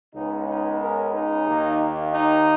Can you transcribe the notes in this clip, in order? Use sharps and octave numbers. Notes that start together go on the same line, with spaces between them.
C#2 C#3 G#3 B3 D#4
D#4
A#4
D#4
D#2 D#3 A#3
D#4